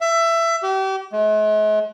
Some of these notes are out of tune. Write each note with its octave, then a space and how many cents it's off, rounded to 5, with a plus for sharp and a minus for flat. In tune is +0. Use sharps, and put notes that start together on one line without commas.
E5 +20
G4 -35
G#3 +45